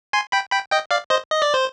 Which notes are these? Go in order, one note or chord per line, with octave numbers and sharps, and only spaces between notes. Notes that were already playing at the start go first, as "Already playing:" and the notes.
G#5 C6
G5 B5
G5 B5
D#5 G5
D5 F5
C5 D#5
D#5
D5
C5